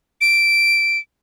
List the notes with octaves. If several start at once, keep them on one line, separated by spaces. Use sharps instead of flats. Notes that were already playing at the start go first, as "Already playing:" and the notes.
D7